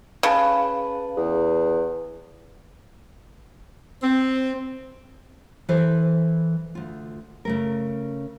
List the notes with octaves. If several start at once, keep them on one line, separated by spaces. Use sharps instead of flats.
C#3 B4 A5
E2
C4
E3 E4 A4 C5
D2 F4
C#3 A3 A#4